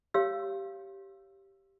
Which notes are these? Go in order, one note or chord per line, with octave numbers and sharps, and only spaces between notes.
G4 C#5 F5 E6